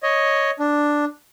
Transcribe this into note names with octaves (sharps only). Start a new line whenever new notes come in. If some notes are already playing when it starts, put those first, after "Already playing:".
C#5 D#5
D4